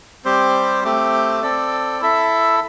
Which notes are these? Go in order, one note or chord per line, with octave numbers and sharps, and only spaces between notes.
G3 C4 G4 C5
A3 C4 G4
C4 A4 D5
E4 A4 E5